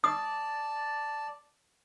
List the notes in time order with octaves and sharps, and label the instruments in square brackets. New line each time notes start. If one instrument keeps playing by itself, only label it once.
[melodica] D5 A5 [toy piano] D#6